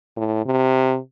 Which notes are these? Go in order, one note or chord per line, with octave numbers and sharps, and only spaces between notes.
A2
C3